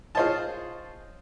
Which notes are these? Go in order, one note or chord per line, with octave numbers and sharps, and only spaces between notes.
F4 G#4 C5 C#5 D#5 A5